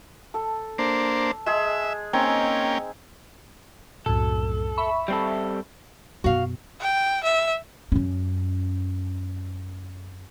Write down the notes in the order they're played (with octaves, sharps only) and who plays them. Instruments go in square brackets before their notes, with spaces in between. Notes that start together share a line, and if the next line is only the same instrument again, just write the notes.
[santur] A4
[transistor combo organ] A#3 D4 C5
[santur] G#3 G#4 [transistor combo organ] E5
[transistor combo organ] A#3 C#4 G5 [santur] C4 D#4 G#5
[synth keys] C2 F#2 A2 [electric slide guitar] A4
[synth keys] E5 B5 C#6
[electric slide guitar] G3 C4 A4
[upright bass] F#2 B2 [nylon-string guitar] F#4 F5
[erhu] G5
E5
[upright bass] F#2 C#4